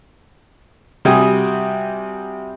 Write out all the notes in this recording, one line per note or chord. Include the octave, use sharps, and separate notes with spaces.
C3 G3 F#4 G5 G#5 D#6